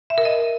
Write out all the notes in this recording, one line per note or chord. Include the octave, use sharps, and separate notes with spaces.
E5
A#4
D#5